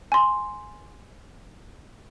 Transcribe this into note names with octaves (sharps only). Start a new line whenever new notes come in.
G#5 C6